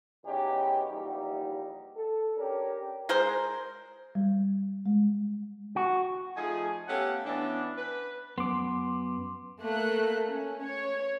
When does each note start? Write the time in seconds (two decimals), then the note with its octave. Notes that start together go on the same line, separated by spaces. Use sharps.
0.25 E2 B2 C#4 D#4 G4 B4
0.91 A#1 E2 G3 A#3 D#4 G4
1.96 A4
2.37 C#4 D4 G4 A#4
3.09 G#3 G#4 A#4 C5
4.15 G3
4.86 G#3
5.76 F#4
6.37 F3 A3 D#4 F4 G#4 G#5
6.88 A3 B3 C#4 G4 F5 F#5
7.26 E3 B3 C#4 D4
7.78 B4
8.38 F#2 B3 C6 D6
9.62 A3 A#3 F#6
10.27 C#4
10.63 C#5